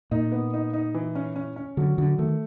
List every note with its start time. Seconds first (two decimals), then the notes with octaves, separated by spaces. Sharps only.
0.11 A#2 D#4
0.32 B3
0.53 D#4
0.73 D#4
0.94 E3
1.15 C#4
1.36 C#4
1.56 C#4
1.77 D3 F#3
1.98 D3 F#3
2.18 D#3 A3